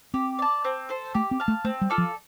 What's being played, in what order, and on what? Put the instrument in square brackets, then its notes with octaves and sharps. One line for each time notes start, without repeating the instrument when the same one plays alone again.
[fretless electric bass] C4 [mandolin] G4
[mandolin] D5 A5
C4
A4 C5
[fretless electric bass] A3 [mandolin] G4
[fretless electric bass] C4
[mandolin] F5 A5
[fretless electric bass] A3
[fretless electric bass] A3 [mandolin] C4
[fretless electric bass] G3
[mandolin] F4 A4 D5
[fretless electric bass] F3